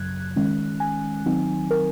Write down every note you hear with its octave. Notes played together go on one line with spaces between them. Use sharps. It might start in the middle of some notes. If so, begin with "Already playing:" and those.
Already playing: F#2 C#3 F#3 F#6 G#6
D#3 G#3 C#4
G#5
D#3 F#3 C4 D#4
A#4